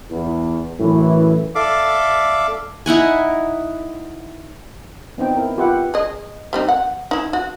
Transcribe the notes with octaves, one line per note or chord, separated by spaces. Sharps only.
E2
F#2 A2 E3
A4 D5 E5 F5 D6
D#4 E4 F#5 G#5
B3 C4 D#4 G5
E4 A#4
F4 G4 B4 E5 F#5
G#4 D#5
G3 C4 D#4
F#5
D#4 E4
F#4